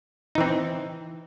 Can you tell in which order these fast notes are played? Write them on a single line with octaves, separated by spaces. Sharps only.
D#4 E3 C4